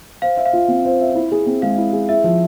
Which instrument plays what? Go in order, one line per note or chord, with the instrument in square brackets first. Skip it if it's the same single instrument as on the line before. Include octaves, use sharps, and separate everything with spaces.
[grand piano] C5 [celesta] F5
[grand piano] E5
[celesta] F5
[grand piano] F4
C4
C5
E5
E4
G#4
C4
[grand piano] G#3 [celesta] F5
[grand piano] E4
G#4
[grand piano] E4 [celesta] E5
[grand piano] F3